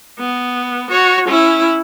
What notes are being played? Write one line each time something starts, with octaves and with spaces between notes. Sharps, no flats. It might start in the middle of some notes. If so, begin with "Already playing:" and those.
B3
F#4 C#5
C#4 E4